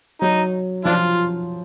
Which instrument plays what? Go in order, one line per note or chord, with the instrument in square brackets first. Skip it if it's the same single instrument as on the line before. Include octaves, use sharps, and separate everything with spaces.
[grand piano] F#3 [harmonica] D#4
[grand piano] F3 [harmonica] D4 F4